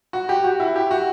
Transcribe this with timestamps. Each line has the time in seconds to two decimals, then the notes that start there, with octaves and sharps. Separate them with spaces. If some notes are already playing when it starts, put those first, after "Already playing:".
0.13 F#4
0.29 G4
0.44 F#4
0.60 E4
0.76 G4
0.91 F#4